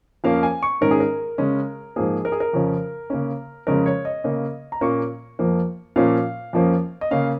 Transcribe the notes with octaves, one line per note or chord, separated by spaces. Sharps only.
F2 F3 A#3 C#4 F5
G#5
C#6
G#2 D#3 C#4 A#4
G#4
A#4
C#3 G#3 C#4
G#2 F3 A#3 G#4
A#4
G#4
A#4
F2 C#3 F3 C#4
C#3 A#3 C#4
F2 C#3 G#3 C#4 A#4
C#5
D#5
C#3 A#3 C#4
A#5
A#2 A#3 C#4 C#6
F2 F3 A#3
A#2 F3 A#3 C#4 F5
F2 F3 A#3 C#4
D#5
C#3 A#3 C#4 F5